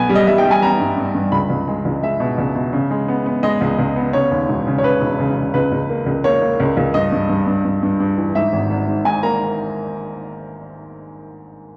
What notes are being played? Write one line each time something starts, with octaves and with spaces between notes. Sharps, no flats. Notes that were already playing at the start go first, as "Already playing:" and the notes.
Already playing: B1 B3 G#5
G3
D#5
G3 E5
G5
G3
G#5
B3 A#5
G2
G2
G2
C#2 B5
C#2
G#3
C#2
G#3 E5
B2
C#2
B2
C#3
G#3
B3
B3
G#3 D#5
C#2
C#2
B3
C#3 C#5
D#2
E1
C#3
C#5
C#3 B4
E1
C#3
C#3
C#2 B4
C#2
A#3
C#2
A#3 C#5
A#3
C#2
C#2
G2 D#5
G2
G2
G2
G2
G2
G2
E3
G#2 E5
G#1
G#1
G#2
G#2 G#5
A#3 A#5